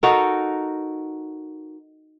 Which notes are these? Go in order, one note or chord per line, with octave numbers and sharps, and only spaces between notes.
D#4 F#4 A4 A#4